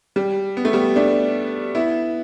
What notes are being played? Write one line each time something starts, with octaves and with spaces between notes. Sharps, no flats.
G3
B3
A3
G3 B3
A3 D4
B3 E4